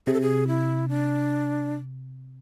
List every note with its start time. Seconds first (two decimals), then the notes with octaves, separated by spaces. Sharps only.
0.07 C3 G#4
0.14 A4
0.21 G#4
0.48 E4
0.89 D4